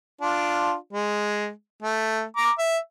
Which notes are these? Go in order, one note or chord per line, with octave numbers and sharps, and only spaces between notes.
D4 F4
G#3
A3
A#5 D6
E5